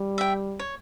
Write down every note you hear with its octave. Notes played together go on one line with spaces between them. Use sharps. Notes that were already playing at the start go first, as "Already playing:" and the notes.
Already playing: G3
E5 G5
C#5